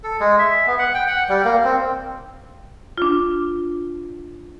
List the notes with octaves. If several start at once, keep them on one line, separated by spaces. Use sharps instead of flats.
A4
G#3
E5
B3
F#5
G5
F#5
G3
A#3
C4
D4 F4